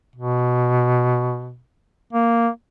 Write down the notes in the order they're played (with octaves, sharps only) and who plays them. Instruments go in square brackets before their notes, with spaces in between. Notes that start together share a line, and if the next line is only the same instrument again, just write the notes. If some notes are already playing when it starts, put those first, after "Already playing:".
[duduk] B2
A#3